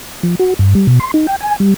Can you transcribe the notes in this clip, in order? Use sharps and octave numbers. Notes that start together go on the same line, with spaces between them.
F3
F#4
G2
G3
B2
C6
D#4
G5
G#5
G3